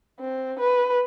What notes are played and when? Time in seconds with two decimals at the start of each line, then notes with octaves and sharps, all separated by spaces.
0.19 C4
0.59 B4